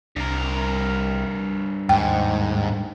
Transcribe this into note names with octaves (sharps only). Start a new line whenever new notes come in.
C2 G2 A#4
D#2 G#2 G5